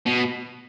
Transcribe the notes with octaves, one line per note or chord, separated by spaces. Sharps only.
B2